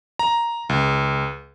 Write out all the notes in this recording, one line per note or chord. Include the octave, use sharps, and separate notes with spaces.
A#5
C#2